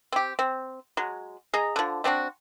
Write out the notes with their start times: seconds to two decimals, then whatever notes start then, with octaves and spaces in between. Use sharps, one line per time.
0.12 C4 G4
0.39 C4
0.97 F#3 G#3
1.53 G#4 D#5 A#5
1.76 D3 F3
2.04 A3 C4 D4 F#4